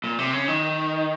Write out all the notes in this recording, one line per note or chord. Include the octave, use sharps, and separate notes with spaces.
A#2
C3
C#3
D#3